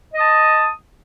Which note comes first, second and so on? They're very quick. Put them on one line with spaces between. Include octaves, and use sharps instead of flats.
D#5 D#6 A5